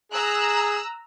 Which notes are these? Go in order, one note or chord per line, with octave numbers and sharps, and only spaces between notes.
G#4 A#5 E6 F#6